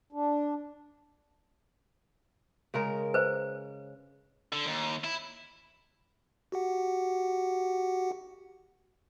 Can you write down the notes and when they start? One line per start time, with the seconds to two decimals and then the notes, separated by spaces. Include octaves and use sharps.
0.12 D4
2.74 C#3 G#3 A#4
3.14 B4 C5
4.53 D3
4.66 D#2
5.04 E4
6.52 F#4 G4 F#5